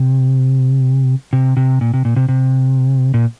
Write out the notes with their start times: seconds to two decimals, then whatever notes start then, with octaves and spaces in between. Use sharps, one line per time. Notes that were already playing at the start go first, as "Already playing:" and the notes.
Already playing: C3
1.33 C3
1.57 C3
1.81 A#2
1.94 C3
2.05 A#2
2.16 C3
2.29 C3
3.14 A#2